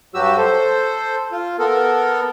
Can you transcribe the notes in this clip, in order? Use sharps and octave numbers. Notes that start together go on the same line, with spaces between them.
G2 F#3 F#4 G4 E6
A4 C5
F4
B3 A4 A#4